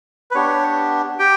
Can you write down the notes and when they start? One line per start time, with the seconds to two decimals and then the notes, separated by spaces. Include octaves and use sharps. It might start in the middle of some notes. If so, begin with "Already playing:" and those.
0.31 B4
0.35 B3 D4 G4 C#5
1.19 G4 G5